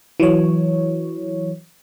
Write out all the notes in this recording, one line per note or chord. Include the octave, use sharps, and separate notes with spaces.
E3 F#3 C#5